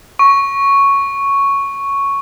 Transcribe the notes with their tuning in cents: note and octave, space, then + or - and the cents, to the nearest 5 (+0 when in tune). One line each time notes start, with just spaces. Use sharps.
C#6 +0